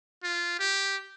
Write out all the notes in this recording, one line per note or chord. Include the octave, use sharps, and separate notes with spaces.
F4
G4